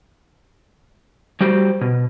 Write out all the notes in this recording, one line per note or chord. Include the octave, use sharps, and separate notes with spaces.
G3 F#4 G4 C5
B2